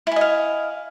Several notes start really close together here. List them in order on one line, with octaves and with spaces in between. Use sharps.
E4 G#5 D#5 F5